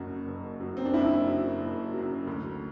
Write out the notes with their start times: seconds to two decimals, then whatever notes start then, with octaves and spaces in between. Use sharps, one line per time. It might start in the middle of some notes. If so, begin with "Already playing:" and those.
Already playing: F#1 F#2 F#3 F#4
0.27 F#1
0.60 F#2 F#3
0.77 C4
0.85 D4
0.94 F#1 E4
1.27 F#2 F#3
1.60 F#1
1.94 F#2 F#3
2.27 D2